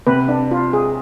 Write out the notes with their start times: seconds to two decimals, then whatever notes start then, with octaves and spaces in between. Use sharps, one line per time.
0.07 C3 B4
0.28 D4
0.51 F4
0.73 G#4